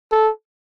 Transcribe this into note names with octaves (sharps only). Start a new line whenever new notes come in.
A4